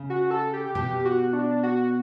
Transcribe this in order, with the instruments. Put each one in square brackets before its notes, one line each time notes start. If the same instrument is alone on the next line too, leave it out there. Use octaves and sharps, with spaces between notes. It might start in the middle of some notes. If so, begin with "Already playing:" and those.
Already playing: [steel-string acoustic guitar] C#3
[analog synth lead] F#4
A4
G4
[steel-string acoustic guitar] B2 [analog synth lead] G4
[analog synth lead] F#4
D4
F#4